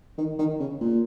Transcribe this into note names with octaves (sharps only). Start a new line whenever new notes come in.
D#3
D#3
C#3
A#2